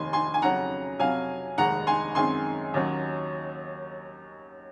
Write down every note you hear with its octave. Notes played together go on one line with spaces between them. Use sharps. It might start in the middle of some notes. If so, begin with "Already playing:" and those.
Already playing: F1 D#2 D#3 G#5 C6
G#5 C6
G#5
F2 C#3 F#3 F#5 A#5
F2 C3 F#3 F5 G#5
F1 D#2 D#3 G#3 F#5 A#5
G#5 C6
F#2 D#3 G#3 C4 G#5 C6
D#2 D#3 F#3 C#4